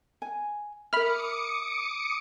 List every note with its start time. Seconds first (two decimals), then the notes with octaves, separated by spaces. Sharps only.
0.22 G#5
0.93 A#4 E5 B5 D6 D#6 F6 C#7